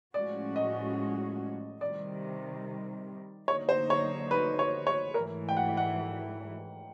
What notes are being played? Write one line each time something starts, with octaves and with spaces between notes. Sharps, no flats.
A2 F3 G#3 C#4 F#4 D5
D#5
C3 D#3 G3 D5
D3 F#3 A#3 D#4 C#5
C5
C#5
B4
C#5
C#5
G#2 E3 A3 A#4
G5
F#5
F#5